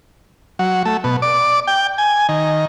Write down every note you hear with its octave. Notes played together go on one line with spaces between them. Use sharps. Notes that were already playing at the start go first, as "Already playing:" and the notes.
F#3
A3
B2
D5
G5
G#5
D#3